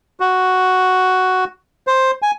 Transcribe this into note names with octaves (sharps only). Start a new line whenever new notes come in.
F#4
C5
G#5